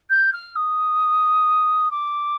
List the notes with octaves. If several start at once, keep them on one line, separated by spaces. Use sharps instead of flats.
G6
F6
D#6
D6